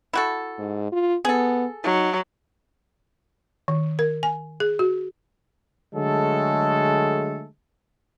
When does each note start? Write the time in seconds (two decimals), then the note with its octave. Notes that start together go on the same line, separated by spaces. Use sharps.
0.13 E4 F#4 A4
0.58 G#2
0.92 F4
1.25 B3 G#4 A4
1.84 F#3 D#4
3.68 D#3
3.99 A#4
4.23 G#5
4.60 G#4
4.79 F#4
5.94 D3 F#3 G#3 A3 G#4 A4